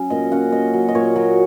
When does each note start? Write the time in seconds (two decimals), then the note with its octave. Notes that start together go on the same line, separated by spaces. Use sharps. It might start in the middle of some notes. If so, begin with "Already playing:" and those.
Already playing: F#3 C#4
0.10 A#2 D#5
0.32 C#4 F#5
0.52 C#4 D#5
0.74 F#3
0.89 D#5
0.95 A#2 C#5
1.16 F#3